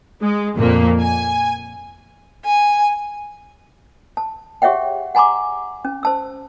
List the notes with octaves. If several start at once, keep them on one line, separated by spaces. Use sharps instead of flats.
G#3
F2 A#2 A#3
G#5
G#5
A5
G4 G#4 C#5 E5 F#5 G5
F#5 G#5 A#5 C6 D6
C#4
C5 A5 E6